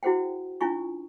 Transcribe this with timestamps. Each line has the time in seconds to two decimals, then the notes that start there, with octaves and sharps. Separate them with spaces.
0.03 E4 F#4 G#4 C5 F#5 G5
0.61 C#4 D4 E4 F4 G#5 C#6